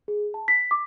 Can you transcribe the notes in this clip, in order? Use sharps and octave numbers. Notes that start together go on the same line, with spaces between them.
G#4
A5
B6
D6